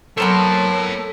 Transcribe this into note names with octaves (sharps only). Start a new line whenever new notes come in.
F#3 B3 A4 A#4 C5 C#5 A5